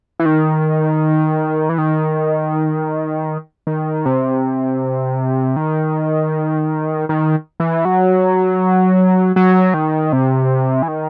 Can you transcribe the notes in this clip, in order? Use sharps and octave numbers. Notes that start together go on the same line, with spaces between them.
E3
D#3
E3
D#3
D#3
C3
D#3
D#3
E3
F#3
F#3
D#3
C3
E3
D#3